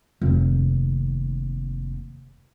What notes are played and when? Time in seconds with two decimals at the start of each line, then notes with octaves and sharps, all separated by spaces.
0.21 F1 D#2